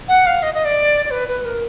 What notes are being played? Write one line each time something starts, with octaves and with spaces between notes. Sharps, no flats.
F#5
F5
D#5
D#5
D5
D5
B4
B4
A#4